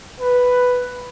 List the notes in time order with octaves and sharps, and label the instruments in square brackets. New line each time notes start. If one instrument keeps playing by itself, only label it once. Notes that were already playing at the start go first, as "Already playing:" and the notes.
[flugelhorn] B4